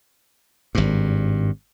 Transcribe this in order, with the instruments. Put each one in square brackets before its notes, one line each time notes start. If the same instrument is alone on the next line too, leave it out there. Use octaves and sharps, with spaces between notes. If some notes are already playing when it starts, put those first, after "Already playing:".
[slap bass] G#1 G2